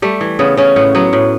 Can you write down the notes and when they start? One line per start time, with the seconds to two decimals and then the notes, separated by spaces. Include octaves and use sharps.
0.02 G3 A3
0.21 E3
0.39 C#3 B3
0.57 C#3 C#4
0.76 A2 B3
0.95 F#3 B3
1.13 A2